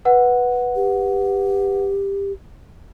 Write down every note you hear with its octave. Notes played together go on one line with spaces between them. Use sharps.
B4 F#5
G4